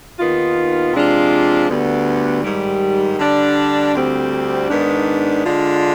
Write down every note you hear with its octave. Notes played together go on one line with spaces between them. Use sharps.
D#2 D#3 B3 F4
C3 F3 G#3 D4 F4
D2 D3 G3 B3
G#2 D#3 G3
D3 G3 D4
D2 D3 G3 C4
G#2 D#3 B3 D4
D3 G#3 D4 F4